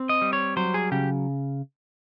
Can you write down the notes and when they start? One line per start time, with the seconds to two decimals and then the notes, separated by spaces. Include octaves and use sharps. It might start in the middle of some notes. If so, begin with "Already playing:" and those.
Already playing: C4
0.09 D#5
0.22 G3
0.33 C#5
0.57 F#3 C5
0.74 G#4
0.92 C#3 G4